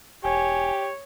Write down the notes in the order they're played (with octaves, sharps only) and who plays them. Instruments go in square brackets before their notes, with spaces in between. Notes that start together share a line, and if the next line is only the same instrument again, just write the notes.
[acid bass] E1 [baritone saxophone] G4 [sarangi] C#5 [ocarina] G#5